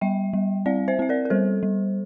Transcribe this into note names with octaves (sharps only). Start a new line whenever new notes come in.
G3 E5 G5
G3
C4 D5 F5
C5 E5
C4 E5
A#4 D5
A#4
G3 A4 C5
G3